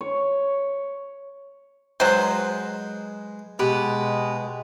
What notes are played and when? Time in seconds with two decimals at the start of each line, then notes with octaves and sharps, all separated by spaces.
0.01 C#5
2.00 F#3 G#3 B4 C5
3.59 B2 G#3 G4 B4 F#5